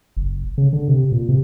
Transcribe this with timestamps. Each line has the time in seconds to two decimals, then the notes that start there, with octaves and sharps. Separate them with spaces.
0.17 F#1
0.58 C#3
0.73 D3
0.88 C3
1.12 A#2
1.29 C3